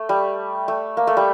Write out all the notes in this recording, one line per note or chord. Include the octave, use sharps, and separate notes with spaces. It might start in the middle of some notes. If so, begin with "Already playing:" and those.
Already playing: A3
G3
A3
A#3
A3
G3